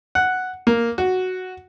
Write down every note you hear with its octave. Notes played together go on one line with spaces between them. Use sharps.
F#5
A#3
F#4